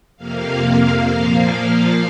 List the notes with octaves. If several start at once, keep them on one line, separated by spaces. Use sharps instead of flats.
F2 C3 A#3 F5
A#2 F3 A#3